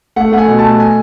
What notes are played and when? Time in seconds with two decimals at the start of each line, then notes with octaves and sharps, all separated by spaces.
0.16 A3 F#5
0.32 A3 F#5
0.38 G#5
0.48 B2
0.59 A5
0.64 A3
0.80 G#5